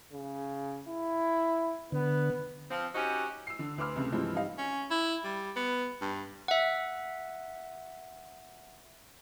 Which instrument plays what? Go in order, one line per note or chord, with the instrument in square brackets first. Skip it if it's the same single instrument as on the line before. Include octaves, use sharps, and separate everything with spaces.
[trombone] C#3
E4
[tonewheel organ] D3 [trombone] B3
[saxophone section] F3 C4
C#4 D#4 F#4 G4 C5
[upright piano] E6 C7
D3
D2 B4 C6 D6 E6 F6
C2 C#3 A3
G2 E3 F3 G#3 C4
G3 D#4 D#5 F5
[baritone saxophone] C#4
E4
G3
B3
G2
[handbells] E5 F#5